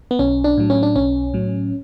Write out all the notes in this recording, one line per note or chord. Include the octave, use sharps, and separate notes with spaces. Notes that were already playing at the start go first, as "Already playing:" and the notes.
B3
B1 C#4
D4
A2 F#3
C#4
D4
B1 C#4
A2 F#3